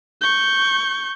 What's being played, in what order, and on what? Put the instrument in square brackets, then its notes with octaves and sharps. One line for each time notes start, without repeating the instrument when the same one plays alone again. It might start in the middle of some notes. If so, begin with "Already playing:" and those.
[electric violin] C#6 G6